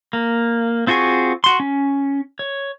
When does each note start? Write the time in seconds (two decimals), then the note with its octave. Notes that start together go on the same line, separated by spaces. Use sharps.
0.13 A#3
0.87 C4 F4 F#4 G#4 C#6
1.44 F#4 C6
1.60 C#4
2.39 C#5